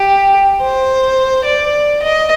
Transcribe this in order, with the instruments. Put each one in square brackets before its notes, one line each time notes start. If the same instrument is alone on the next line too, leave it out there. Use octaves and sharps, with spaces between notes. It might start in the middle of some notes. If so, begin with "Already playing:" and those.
Already playing: [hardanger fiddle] G4
C5
D5
D#5